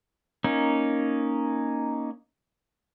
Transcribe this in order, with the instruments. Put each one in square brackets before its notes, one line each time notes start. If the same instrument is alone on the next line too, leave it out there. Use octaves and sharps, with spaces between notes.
[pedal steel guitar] A#3 C#4 D#4